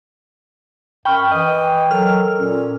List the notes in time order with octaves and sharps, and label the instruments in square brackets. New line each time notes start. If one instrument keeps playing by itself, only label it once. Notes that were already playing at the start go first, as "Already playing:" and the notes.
[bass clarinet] F#2 [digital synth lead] G5 [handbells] B5 C#6 F6
[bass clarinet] E3 [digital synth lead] D#5 [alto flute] G5
[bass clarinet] F#3 [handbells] A4 A#4 [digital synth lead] F6
[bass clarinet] A#2 [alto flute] C#4